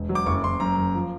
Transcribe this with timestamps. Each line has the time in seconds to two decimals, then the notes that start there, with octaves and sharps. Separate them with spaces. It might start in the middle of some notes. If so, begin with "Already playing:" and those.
Already playing: E1
0.09 F#3
0.15 D6
0.26 F#1 C#6
0.44 F#1 C6
0.60 F#2 A#5
0.78 F#2
0.95 F3